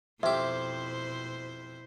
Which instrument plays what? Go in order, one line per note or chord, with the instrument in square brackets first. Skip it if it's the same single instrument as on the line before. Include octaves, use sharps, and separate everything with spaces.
[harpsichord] F2 G4 [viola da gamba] B2 E4 C5 [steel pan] E5